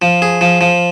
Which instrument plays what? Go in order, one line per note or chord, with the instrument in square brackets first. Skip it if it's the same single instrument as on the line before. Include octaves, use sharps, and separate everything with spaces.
[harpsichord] F3
G#4
F3
F3